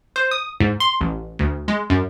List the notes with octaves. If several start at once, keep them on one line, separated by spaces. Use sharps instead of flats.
C5
D#6
G#2
C6
A1
D2
G#3
F#2